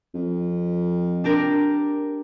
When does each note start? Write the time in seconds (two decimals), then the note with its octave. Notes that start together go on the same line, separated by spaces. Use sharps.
0.15 F2
1.24 D4 G4 A#4